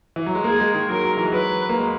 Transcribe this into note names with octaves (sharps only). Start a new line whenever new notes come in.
E3
F#3
G#3
A#3 G#4
G#3
D#3
F#3 A#4
F#3
E3
G#3
F#3 B4
A#3
G#3